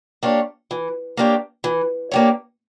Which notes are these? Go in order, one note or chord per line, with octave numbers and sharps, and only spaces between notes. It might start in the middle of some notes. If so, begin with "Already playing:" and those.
A#3 D4 G4 C#5
E3
A#3 D4 G4 C#5
E3
A#3 D4 G4 C#5